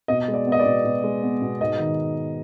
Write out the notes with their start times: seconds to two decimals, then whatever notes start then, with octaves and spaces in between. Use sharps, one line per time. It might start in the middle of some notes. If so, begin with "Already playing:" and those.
0.08 B2 D#5
0.28 G#3
0.34 D5
0.47 B3
0.52 D#5
0.59 D5
0.66 B2
0.85 B2
1.04 G#3
1.23 B3
1.42 B2
1.61 G#2 D#5
1.79 D#3